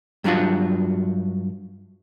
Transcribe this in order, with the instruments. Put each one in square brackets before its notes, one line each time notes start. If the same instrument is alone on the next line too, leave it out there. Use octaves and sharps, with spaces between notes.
[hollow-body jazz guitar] G2 F#3 D4 F4 F#4